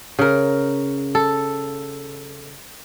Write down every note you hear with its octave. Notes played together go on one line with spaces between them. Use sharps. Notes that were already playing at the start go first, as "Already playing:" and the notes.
C#3 A#4
A4